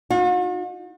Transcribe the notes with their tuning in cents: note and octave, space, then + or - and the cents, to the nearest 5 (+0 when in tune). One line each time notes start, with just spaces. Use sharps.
D#4 +0 F#4 -45